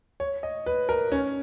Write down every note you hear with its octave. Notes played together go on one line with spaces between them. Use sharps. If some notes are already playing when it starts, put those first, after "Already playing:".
C#5
D#5
B4
A#4
C#4